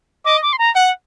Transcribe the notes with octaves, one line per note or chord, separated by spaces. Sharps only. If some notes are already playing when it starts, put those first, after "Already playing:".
D#5 D6
D6
C6
A#5
F#5